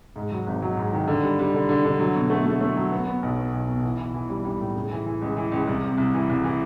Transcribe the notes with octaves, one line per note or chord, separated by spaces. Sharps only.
G#2
F#3
G#1
F#3
G#2
D#3
D3
G3
G3
D3
D3
D3
F#3
B2
A3
A3
A3
F#3
B3
B3
B1
B3
B1
B2
E3
E3
E3
G3
G3
A2
C#3
E3
E3
C#2
E3
C#2
C2
C3
C2
E3
C2
E3